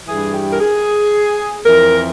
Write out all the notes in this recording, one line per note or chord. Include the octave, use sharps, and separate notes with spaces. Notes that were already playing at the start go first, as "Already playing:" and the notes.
G2 E3 G#4
G4
A#4
G#4
F2 E3 A#4